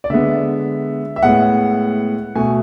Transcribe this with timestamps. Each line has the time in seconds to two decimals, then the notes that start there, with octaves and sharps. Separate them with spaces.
0.04 D5
0.10 D3 G#3 B3 E5
1.16 E5
1.23 A2 G#3 B3 F#5
2.35 B2 A3 G#5